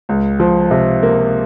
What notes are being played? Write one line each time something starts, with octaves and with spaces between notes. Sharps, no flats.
C#2
F3
C3
A#3